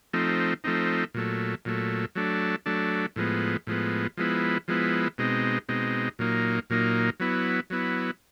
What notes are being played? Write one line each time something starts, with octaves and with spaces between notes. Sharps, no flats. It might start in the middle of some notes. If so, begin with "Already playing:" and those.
F3 A3 C4 D#4
F3 A3 C4 D#4
A#2 F#3 A3
A#2 F#3 A3
F#3 A3 D4
F#3 A3 D4
A2 F3 G#3 B3
A2 F3 G#3 B3
F3 G#3 B3 E4
F3 G#3 B3 E4
B2 G#3 C4 D#4
B2 G#3 C4 D#4
A#2 F#3 A#3 D#4
A#2 F#3 A#3 D#4
F#3 B3 E4
F#3 B3 E4